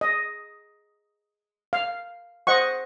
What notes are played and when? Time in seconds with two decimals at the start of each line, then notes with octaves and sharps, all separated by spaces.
0.01 D#5
1.73 F5
2.47 C5 D#5 F#5 C#6